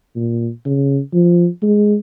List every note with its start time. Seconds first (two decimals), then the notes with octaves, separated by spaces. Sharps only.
0.16 A#2
0.65 C#3
1.13 F3
1.63 G#3